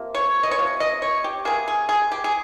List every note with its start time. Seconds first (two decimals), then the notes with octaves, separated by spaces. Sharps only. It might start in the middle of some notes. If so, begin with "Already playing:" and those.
Already playing: C3 F3 A#3
0.15 C#5
0.43 D#5
0.51 C#5
0.59 C3 F3
0.80 D#5
1.02 C#5
1.24 G4
1.45 C3 F3 A#3 G#4
1.68 G#4
1.89 G#4
2.11 G4
2.24 G#4